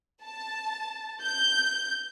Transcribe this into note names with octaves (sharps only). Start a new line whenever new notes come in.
A5
G6